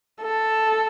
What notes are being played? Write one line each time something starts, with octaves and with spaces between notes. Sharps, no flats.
A4